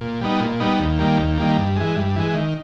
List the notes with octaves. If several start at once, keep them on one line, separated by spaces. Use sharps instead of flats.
A#2
G3 B3 D#4
A#2
G3 B3 D#4
D#2
D#3 G3 A#3
D#2
D#3 G3 A#3
G2
E3 G#3
G2
E3 G#3
D#3